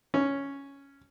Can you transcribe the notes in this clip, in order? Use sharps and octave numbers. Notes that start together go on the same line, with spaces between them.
C#4